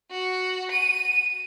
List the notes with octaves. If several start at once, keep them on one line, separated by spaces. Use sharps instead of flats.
F#4
D#7